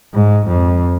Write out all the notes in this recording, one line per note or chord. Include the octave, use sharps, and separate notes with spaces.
G#2
F2